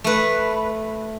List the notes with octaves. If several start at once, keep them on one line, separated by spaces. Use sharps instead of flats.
A3 B4